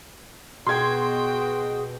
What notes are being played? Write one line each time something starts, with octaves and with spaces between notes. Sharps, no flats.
B2 F#4 G#4 G5 C6 G#6